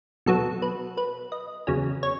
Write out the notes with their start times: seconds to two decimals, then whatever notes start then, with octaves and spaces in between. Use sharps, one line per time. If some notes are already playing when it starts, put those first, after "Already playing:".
0.26 B2 F#3 B3 A4
0.62 B4
0.97 B4
1.32 D#5
1.67 E2 C#3 F#3 C#4
2.03 C#5